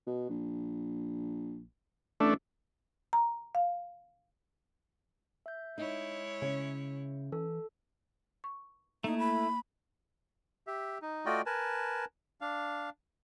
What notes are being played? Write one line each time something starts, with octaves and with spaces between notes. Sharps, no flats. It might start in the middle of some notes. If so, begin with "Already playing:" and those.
B2
A#1
A1 A3 D4
A#5
F5
E5 G6
G#3 D#4 E4 C#5
C#3 C#4
E3 A4
C#6
A3 A#3 D#4 E4
B5
G4 E5
D#4
A3 F4 F#4 D5 D#5 G5
A#4 B4 G#5 A5
D4 F5